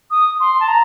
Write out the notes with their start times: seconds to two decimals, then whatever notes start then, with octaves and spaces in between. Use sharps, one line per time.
0.11 D#6
0.40 C6
0.60 A5
0.68 A#5